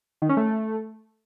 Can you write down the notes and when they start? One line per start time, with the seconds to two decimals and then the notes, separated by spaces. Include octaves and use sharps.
0.22 D#3
0.29 C#4
0.37 A3